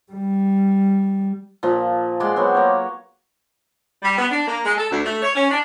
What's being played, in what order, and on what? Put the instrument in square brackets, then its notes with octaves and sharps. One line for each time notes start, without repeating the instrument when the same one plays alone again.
[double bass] G3
[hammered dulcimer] A#2 F3
G#3 D5 F#5 C6
F#3 B3 C4
A#3 C#5
[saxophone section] G3
B3
D4
A#3
G#3
A4
D2
A3
C#5
C#4
D4